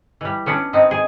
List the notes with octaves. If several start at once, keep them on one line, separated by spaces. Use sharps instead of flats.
E3 G3
B3 C#4 D4
G#3 B3 C4 D#4
G#4